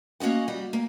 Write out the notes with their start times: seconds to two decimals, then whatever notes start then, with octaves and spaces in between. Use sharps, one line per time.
0.20 A#3 C#4 F#4 D#5 F#5
0.48 G3 F#4
0.73 A#3